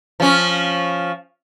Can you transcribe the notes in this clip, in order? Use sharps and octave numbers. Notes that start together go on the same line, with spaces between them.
F3 C#4